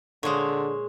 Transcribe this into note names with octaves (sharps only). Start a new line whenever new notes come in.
A#2 D3 G#3 C5 C#5